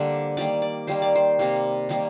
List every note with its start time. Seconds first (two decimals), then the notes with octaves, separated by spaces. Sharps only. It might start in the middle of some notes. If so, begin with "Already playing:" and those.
Already playing: D3 G3 A#3 C5
0.37 D#3 G3 A#3 D5
0.62 D5
0.87 D#3 G3 A#3 C5
1.02 D5
1.15 C5
1.39 C3 G3 A#3
1.89 D#3 G3 A#3